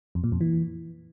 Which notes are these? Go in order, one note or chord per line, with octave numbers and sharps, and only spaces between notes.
F2
A#2
F2
E3